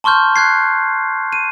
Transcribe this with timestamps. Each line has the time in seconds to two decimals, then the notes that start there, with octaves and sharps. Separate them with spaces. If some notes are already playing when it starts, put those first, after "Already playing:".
0.04 A5 C6 C#6 F6 G6
0.36 F#6 G#6 C7
1.33 D#7